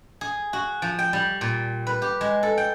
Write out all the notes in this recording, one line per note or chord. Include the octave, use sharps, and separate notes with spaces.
G#4
F#4
F3
G5
G3
A#2
B4
G4
G#3
A4
G5